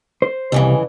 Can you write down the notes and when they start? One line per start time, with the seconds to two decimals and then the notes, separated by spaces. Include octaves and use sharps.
0.22 C5
0.52 C2 F2 C#3 E3